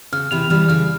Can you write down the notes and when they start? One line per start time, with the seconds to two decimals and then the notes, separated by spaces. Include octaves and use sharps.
0.12 C#3 F6
0.31 C3 E3 F7
0.50 E3 G3 F6
0.69 C#3 F6